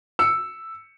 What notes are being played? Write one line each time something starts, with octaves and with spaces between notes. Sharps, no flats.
E6 C#7